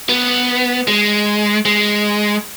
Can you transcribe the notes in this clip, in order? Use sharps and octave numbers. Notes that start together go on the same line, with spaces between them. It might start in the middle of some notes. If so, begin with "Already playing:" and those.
B3
G#3
G#3